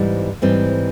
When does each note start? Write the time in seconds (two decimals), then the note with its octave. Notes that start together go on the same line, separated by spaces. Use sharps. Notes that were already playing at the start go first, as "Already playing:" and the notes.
Already playing: G#2 E3 G3 C4
0.42 G#2 E3 G3 C4